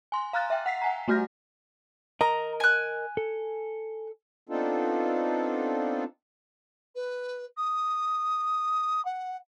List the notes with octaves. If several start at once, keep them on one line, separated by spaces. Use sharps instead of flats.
G#5 C6
F5 A#5 F6 F#6 A6
E5 G5
F#5 B6 C7
F#5 G#5 A#5
G3 A3 F#4 F6 G6 A#6
A#4 D#5 A#5
G#5 F#6
A4
B3 C4 D4 D#4 F4 A4
B4
D#6
F#5